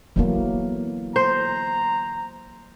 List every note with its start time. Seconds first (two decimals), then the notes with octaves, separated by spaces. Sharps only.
0.16 D3 E3 F#3 A#3 B3
1.16 C5 A#5